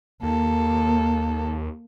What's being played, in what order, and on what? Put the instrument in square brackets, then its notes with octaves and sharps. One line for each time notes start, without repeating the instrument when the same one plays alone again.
[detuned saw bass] D#2 [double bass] A#3 [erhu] A4